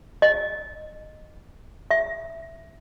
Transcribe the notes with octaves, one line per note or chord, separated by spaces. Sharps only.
D#5
E5